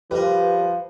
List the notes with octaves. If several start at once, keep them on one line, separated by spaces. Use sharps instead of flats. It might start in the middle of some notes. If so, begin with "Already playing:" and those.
F3 G3 A#4 B4